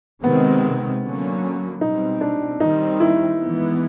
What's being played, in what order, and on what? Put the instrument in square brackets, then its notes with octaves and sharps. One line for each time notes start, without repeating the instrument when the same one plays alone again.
[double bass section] C3 D#3 G#3 C4 [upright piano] B3
[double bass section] D3 F#3 A#3 C#4
[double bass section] B2 G3 C4 [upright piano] D#4
[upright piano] D4
[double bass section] D#3 G3 C4 [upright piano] D#4
[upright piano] E4
[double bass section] E3 G#3 B3